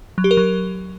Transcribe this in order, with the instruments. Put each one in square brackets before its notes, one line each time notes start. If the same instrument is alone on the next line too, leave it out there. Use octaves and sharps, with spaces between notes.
[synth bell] F#3
G4
A#4
F#3